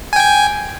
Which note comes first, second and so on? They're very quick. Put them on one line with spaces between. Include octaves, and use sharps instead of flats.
G#5 G5 G#6